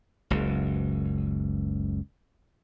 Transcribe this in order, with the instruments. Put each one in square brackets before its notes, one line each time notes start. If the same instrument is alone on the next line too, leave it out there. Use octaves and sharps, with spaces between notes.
[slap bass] F#1 C#2